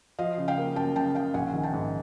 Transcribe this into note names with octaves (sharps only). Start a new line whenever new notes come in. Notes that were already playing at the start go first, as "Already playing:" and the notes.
F3 D#5 F5
C#3
F5 G5
A#3
F#2 G5 A5
C#3 G5 A5
C#3 F5 G5
A#1 F#5 G#5
D#3
G5 A5
G#2